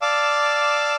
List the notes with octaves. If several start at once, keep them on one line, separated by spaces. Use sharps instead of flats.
D5 F5 A5 D6 E6